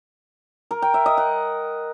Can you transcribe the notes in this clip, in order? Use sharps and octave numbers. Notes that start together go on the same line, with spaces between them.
A#4
G5
E5
D#5
F#5